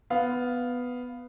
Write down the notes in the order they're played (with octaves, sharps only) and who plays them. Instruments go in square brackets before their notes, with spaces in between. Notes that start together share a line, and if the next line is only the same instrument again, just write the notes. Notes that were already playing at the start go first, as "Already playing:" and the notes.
[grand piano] B3 F5